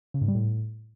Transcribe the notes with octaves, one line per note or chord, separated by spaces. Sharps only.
C#3
G#2
G3
A2